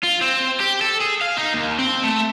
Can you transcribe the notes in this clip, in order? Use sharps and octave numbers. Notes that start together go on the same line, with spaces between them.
F4
C4
G4
A4
G#4
F5
D#4
D#2
C4
A3